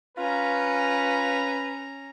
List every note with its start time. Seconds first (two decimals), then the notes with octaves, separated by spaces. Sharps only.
0.17 C#4 F4 B4 A#5